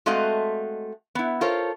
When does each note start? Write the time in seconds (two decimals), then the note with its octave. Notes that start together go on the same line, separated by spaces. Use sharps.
0.06 G#3 A3 C4 F#4 D#5 F5
1.15 B3 E4
1.41 F4 A4 A#4 C5 C#5